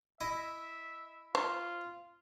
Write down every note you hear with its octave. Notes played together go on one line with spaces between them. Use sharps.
E4 D#5 E5
F4 C5